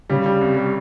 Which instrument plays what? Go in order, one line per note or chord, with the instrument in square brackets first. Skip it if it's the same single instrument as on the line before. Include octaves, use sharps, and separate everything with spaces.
[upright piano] C#3 [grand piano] G3
[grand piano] G3
C2
G3